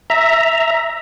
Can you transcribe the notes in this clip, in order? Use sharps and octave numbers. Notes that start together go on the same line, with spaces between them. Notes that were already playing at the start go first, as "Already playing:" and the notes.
E5 A#5